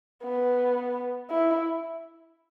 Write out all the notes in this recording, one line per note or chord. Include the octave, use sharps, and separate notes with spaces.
B3
E4